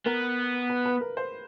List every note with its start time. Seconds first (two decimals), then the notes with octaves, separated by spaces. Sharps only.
0.06 B3 A#4
0.70 B4
0.85 B4
1.01 A#4
1.17 C5